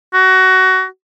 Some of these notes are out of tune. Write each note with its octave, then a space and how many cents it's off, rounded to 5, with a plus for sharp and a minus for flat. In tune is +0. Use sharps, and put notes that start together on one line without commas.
F#4 +20